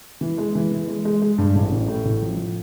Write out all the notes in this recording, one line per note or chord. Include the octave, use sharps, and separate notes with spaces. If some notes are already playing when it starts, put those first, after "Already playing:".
E3
G#3
E3
E3
G#3
G#3
G#3
G2
A1
A1
A2
A1
F3